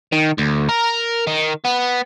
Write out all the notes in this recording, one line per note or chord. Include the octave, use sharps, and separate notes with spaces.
D#3
D2
A#4
D#3
B3